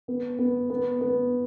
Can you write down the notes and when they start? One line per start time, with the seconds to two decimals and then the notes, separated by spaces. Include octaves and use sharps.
0.08 B3
0.39 B3
0.70 B3
1.01 B3